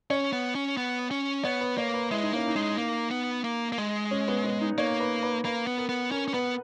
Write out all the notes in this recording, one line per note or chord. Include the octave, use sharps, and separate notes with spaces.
C#4 C#5
B3
C#4
B3
C#4
B3 C#5
B4
A#3 C#5
B4
G#3 E4
D#4
A#3 C#4
D#4
G#3
A#3
B3
A#3
A#3
G#3
C#4
B3
B3
D#4
A#3 C#5
B4
B4
A#3 B4
B3
A#4
B3
C#4 A#4
C#4
B3 B4